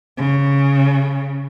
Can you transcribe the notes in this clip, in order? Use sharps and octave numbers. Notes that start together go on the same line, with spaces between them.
C#3